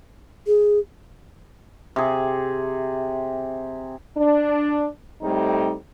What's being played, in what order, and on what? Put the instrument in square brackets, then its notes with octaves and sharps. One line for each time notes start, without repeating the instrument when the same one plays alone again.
[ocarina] G#4
[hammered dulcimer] C3 G#4
[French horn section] D4
A2 G3 A3 C4 D#4